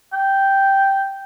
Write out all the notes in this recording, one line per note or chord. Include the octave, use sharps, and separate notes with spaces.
G5